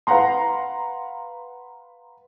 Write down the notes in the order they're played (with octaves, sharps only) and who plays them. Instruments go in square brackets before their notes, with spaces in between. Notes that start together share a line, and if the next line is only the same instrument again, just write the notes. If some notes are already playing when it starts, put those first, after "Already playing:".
[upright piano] B4 F5 F#5 A#5 C6